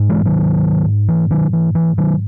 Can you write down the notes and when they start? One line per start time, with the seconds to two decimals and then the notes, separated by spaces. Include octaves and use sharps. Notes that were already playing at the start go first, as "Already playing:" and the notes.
Already playing: G#2
0.09 E3 G#3
0.25 D#3 F#3
1.08 E3
1.31 D#3 F#3
1.53 E3
1.75 E3
1.98 D#3 F#3